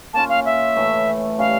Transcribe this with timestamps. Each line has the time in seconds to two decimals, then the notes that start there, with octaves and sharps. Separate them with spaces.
0.13 A#3 C#4 F4 A5
0.29 F5
0.45 E5
0.76 A2 E3 A3
1.39 A2 G3 C#4 F5